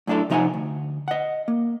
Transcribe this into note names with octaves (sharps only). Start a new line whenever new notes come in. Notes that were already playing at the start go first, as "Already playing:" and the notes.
F#2 A2 D4 E4 A4
C3 F3 D#4 E5 F#5 G#5
D2
D#5 F#5
A#3